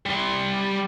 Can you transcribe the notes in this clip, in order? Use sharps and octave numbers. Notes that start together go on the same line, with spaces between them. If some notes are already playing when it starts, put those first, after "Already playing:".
G3 C6